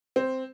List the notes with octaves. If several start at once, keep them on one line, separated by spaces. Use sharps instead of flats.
C4